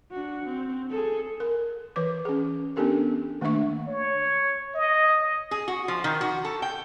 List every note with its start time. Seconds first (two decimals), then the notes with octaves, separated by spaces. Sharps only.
0.11 D4 F#4
0.44 C4
0.90 G#4 A4
1.40 A#4
1.96 E3 B4 D6
2.25 C#4 G#4
2.76 B3 C#4 D4 G4 A4 A#4
3.41 D#3 A3 A#3 D4 E5 C#6
3.88 C#5
4.75 D#5
5.51 G#4
5.68 F#4
5.88 F3
6.04 D#3
6.21 F#4
6.45 A4
6.62 G5